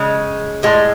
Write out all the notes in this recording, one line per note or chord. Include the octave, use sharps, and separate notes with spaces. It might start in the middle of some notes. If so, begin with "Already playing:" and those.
Already playing: C#3 G#3
A2 G#3